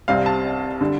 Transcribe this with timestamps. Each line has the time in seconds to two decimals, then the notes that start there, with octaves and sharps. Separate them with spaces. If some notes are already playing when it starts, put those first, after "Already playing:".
0.08 C2 C3 G3 C4 F5
0.26 A5
0.81 D3 G3